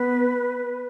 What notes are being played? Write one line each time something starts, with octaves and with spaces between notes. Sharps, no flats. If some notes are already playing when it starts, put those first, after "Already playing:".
Already playing: B3 B4